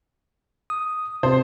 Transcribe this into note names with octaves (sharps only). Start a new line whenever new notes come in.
D#6
C3 C4 C5